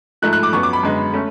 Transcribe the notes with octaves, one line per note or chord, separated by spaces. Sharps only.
G#2 F3 A3 F#6
F#6
D6
F#2 F3 B3 C#6
D6
B5
F#2 D3 G#3 B3
A3 C#4